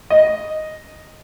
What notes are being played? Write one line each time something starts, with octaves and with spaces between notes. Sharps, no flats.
D#5